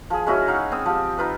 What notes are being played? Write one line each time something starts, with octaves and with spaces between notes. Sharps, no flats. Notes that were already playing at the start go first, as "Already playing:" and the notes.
F3 G#4
G#3 C#4 E4 F#4
D#4 F5 F#5
C4 D#6 E6
F3 G4
D#4 F4 B4 E6